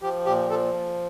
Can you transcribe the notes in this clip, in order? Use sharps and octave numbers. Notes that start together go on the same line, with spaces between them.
F3 G4
A#2 G4
F3 A4